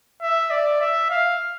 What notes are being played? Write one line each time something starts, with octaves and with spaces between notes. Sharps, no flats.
E5
D5
E5
F5